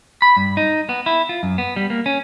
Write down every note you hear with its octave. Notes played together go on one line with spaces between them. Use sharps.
B5
G2
D#4
B3
E4
F4
F#2
B3
G3
A#3
C#4